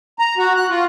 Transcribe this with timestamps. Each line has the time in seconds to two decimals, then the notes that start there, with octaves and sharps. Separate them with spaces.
0.19 A#5
0.38 F#4
0.56 F#6
0.69 F4